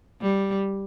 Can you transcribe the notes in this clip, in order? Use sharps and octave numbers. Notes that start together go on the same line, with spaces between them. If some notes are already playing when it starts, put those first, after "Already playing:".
G3